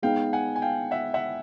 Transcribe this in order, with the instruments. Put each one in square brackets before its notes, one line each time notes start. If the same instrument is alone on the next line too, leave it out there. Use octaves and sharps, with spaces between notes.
[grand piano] G#3 B3 D#4 [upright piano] F5 G5
[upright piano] F#5 G#5
G#5
F5 G5
E5 F#5
E5 F#5